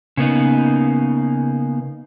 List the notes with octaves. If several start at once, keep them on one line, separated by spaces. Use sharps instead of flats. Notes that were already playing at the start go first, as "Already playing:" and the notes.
C#3 A#3 B3 D#4